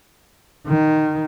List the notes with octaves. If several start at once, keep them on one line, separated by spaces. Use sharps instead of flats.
D#3